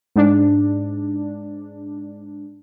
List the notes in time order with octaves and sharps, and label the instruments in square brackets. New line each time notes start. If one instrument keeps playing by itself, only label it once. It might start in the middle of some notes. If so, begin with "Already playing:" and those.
[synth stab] G#2 D4